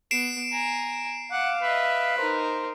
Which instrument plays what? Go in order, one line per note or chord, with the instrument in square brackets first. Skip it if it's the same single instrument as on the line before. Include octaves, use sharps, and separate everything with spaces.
[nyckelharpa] B3 [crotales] C7 D7 E7
[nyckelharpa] G#5 A#5
[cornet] F5 [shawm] F#5 [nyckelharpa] D6
[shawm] B4 [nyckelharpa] D#5 E5
[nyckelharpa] D#4 A#4 [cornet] C5